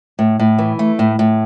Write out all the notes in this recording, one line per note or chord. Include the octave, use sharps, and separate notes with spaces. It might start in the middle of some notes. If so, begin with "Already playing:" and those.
A2
A2
E3
A3
A2
A2